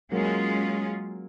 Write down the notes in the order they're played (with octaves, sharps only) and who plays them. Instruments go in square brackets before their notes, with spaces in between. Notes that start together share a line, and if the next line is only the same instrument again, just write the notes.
[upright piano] F#3 A#3 [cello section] G#3 C#4 F4 G#4